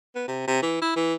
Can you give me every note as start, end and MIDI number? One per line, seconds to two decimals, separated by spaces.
0.15 0.26 59
0.28 0.46 48
0.47 0.60 48
0.62 0.77 52
0.81 0.92 64
0.96 1.14 52